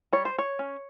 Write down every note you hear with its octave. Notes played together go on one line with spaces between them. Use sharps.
G3 C#5
C5
C#5
C#4